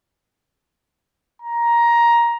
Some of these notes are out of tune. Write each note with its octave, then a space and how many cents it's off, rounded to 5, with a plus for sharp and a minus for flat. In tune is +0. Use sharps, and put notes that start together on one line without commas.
A#5 +10